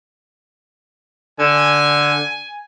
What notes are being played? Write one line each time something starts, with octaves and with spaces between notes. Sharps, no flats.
D3 G#5